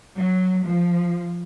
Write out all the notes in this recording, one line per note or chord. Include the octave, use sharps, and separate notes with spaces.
F#3
F3